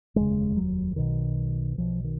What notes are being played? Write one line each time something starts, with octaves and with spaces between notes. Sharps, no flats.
F1 D#2 C#3 G#3
F#3
B1 B2 D#3
B1 B2 F3
D#3